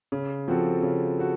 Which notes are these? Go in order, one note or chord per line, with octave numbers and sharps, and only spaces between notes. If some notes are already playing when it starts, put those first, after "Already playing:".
C#3
F3 C4 F#4 A4
C#3
F#4 A4